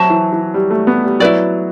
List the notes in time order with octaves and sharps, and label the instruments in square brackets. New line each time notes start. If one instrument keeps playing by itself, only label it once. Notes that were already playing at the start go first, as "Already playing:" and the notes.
Already playing: [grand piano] F#3 [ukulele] F#4 C5 E5 A5
[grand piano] E3
E3
G3
A3
B3
G3
[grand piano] F#3 [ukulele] E4 B4 D5